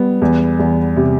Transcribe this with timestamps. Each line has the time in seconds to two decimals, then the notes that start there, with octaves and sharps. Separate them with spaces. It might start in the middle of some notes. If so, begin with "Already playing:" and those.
Already playing: G3 B3
0.22 E2
0.59 E2
0.96 C3